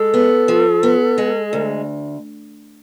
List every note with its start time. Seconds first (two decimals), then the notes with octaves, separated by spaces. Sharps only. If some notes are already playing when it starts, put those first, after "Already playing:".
Already playing: G#3 A4
0.14 B3
0.48 F3
0.83 B3
1.18 G#3
1.53 D2